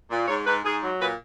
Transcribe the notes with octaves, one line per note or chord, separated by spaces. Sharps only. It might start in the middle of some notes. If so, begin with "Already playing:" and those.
A#2
G#2 C#5
G#2 B4
G#2 G#4
F#3
A#2 B4